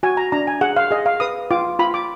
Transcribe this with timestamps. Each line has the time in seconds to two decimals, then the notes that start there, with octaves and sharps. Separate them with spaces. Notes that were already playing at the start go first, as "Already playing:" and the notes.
0.03 F#4 G#5
0.17 A#5
0.32 D4 A#5
0.47 G#5
0.61 G#4 F#5
0.76 F5
0.91 G#4 D#5
1.06 F5
1.20 B4 D#6
1.51 F4 D6
1.79 F4 B5
1.94 D6